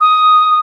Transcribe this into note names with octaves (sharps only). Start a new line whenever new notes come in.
D#6